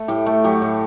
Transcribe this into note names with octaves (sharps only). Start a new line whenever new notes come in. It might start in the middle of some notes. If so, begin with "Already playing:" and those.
Already playing: A3
A2 G4
A3
F#3 G4
A2